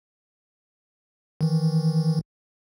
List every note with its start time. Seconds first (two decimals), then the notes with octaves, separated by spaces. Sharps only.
1.41 D#3 E3